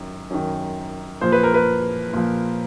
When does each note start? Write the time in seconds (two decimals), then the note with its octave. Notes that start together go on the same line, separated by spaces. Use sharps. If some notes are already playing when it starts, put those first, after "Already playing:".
Already playing: F#2 D#3
0.30 F#2 D#3
1.21 A#2 F3 C5
1.32 B4
1.43 A#4
1.54 B4
2.13 A#2 F3